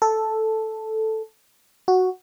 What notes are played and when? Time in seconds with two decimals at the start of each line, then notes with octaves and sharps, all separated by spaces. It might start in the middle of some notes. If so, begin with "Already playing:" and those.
0.02 A4
1.88 F#4